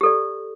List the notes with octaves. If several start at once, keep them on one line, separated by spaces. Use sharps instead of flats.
G4 A4 D5